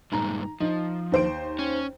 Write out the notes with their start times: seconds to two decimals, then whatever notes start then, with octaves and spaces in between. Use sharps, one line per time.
0.12 G2 A#2 D#3 G#3 A#5
0.60 F3 D#4
1.12 D#2 C5 D7
1.59 C#4